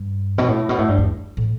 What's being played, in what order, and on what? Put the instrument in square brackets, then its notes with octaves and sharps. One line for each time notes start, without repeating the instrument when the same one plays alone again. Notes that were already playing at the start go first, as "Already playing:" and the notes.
Already playing: [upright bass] G2
B2
A2
B2
A2
G2
E2
A2